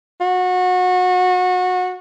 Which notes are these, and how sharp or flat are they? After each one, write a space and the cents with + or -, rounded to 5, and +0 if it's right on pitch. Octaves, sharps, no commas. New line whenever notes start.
F#4 -25